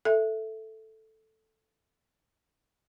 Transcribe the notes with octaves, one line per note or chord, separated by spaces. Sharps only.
A4 E5